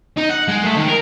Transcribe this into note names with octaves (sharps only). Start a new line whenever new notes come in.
D#4
F#5
G#3
A3
D#3
A#4